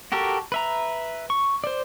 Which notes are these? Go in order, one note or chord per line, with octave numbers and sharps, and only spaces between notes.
F#4 G4 A4 A#4
B4 E5 A#5
C#6
C5 D5